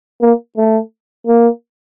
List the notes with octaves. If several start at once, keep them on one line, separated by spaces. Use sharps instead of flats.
A#3
A3
A#3